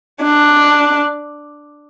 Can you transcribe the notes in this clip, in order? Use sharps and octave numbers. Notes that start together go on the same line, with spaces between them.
D4